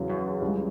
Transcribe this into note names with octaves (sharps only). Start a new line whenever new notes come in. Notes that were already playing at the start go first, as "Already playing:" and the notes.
Already playing: E2 C#3 F#3
F#2
C#2 C#3 G3